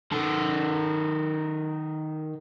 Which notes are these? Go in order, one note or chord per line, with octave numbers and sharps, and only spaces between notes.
D#3 A4